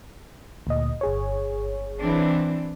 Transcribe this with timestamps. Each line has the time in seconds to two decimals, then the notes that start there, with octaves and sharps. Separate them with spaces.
0.67 D2 A#2 D#5
1.01 G1 G#4 C#5
1.98 E3 C4 D4